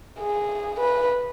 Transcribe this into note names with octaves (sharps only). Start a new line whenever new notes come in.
G#4
B4